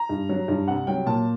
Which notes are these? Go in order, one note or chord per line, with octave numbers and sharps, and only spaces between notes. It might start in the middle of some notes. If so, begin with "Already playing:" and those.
Already playing: A#5
G2
F#3
G2
C2 F#5
F#3 G5
A#2 A5